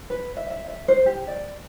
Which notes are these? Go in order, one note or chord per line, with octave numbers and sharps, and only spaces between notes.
B4
E5
E5
E5
C5
G4
D5